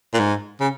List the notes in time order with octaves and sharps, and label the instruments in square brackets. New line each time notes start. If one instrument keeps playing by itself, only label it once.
[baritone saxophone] A#2
G#2
C#3